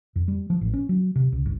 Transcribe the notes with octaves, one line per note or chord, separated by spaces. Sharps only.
F2
G3
F3
A1
C#4
F#3
C3
C#2
G1